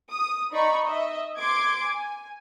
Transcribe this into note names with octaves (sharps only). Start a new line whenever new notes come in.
D#6
D#4 D5 A#5 B5 C#6
D#5 E5
C6 D6 G#6 D7
G#5